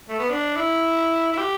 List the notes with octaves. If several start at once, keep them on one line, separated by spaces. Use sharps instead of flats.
A3
B3
D4
E4
E4
G4